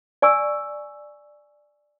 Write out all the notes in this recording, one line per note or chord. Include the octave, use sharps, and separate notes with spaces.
D5 G#5 C#6 E6